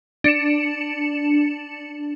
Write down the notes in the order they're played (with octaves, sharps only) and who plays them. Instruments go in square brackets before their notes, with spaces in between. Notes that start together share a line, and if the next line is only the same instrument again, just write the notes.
[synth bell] D4 C#7 E7